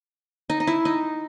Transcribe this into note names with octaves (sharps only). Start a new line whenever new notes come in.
D#4
D#4
E4
D#4